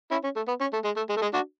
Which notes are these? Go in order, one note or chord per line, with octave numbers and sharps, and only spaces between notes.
C#4 E4
C#4
A3
B3
C#4
A3
G#3
A3
G#3
A3
G#3
D4 F#4